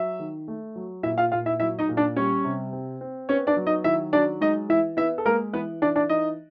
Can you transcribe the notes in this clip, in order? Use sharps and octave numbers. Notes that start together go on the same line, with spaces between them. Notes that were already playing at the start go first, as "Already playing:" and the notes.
Already playing: F#3 E5
D#3
A3
F#3
A#2 E4 E5
F4 F5
A#2 F4 F5
E4 E5
F#3 E4 E5
D#4 D#5
A#2
D4 D5
G3 C#4 C#5
C3
C4
C4
B3 C#4 C#5
D4 D5
F#3
D#4 D#5
D#3 E4 E5
F#3 D4 D5
G#3 D#4 D#5
E3 E4 E5
B3 E4 E5
A4
G#3 A#3 A#4
E3 B3 B4
E3 D4 D5
D4 D5
E3 D#4 D#5